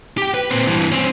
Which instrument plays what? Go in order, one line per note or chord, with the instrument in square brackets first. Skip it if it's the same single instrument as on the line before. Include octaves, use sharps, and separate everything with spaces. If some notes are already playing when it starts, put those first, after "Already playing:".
[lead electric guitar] G4 G5
B4
A#2 C4
G2 E3
C4 C#4